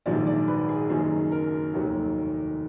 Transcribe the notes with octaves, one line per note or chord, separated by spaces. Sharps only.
A#1 G#2 D#3 F#3 D5
D5
B4
G#4
F#1 F#2 D#3 F#3 G#4
A#4
F1 D#2 D#3 F#3